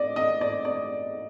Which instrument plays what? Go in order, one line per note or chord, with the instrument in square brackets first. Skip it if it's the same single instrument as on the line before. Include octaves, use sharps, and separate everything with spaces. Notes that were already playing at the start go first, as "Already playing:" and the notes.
Already playing: [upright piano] D5 D#5
D#5
D5
D5